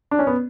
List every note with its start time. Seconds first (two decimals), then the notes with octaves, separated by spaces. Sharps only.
0.11 D4
0.19 C#4
0.27 B3